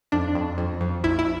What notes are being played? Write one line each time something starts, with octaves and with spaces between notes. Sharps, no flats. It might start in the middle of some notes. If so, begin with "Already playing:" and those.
F2 D4
F2
F2
F2
A#1 E4
E4